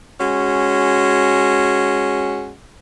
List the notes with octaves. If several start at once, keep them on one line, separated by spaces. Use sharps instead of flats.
G#3 C#4 F#4